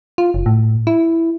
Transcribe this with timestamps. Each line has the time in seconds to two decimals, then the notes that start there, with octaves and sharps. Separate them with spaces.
0.18 F4
0.34 F#1
0.46 A2
0.87 E4